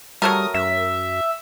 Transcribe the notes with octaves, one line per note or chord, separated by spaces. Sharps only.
F#3 G3 A3 A#4 D#6
F#2 E5